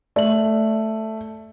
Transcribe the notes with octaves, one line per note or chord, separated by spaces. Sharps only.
A3 D5 F#7